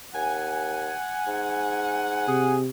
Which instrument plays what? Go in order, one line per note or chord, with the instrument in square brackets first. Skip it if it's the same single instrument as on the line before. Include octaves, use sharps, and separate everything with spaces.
[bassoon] D#2 [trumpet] F#5 [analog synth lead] G#5
[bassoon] G#2
[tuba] C3 [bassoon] G#4